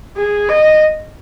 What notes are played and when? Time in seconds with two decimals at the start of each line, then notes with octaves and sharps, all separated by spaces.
0.17 G#4
0.49 D#5